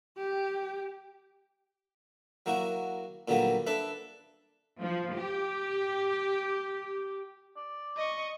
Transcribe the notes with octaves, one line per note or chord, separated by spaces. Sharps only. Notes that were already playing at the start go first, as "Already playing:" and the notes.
G4
F#3 A#3 E4 F#4
A#2 D3 F#3 G3 A#3 B3
D4 A4 B4 E5
F3
G4
D5
D#5 C#6